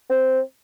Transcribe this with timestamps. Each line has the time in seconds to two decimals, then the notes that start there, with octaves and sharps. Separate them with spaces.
0.10 C4